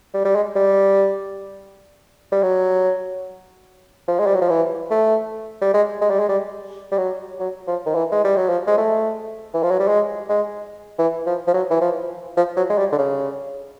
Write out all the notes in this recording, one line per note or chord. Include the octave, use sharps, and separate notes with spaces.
G3
G3
G#3
G3
G3
F#3
F3
G#3
G3
F#3
F3
E3
A3
G3
G#3
G#3
G3
G#3
G3
G3
F#3
F#3
F3
D#3
E3
G#3
G3
F#3
F3
G#3
A3
E3
F3
F#3
G3
G#3
G#3
E3
F3
F3
F#3
E3
F3
F3
F#3
G#3
G3
D3
C#3